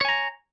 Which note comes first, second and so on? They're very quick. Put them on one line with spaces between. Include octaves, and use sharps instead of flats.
C#5 G#5 A#5